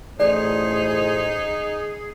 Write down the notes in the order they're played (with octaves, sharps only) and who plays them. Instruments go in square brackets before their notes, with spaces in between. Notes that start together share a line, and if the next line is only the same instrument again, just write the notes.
[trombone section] A1 A2 C5 [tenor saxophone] D#4 [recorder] G#4 [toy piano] D5